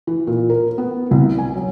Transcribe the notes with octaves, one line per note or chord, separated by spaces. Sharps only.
E3
A#2
A#4
B3
C2
G#5
F#3